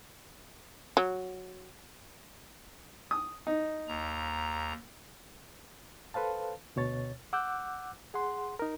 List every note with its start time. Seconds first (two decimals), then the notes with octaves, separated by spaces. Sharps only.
0.97 F#3
3.11 D#6
3.47 D#4
3.88 D#2 A#5
6.14 A4 B4 C5 F5 A5
6.76 D2 B2 C#5 A6
7.33 F#5 D6 E6 F#6 G6
8.14 G#4 F#5 C6
8.59 D#4 A#4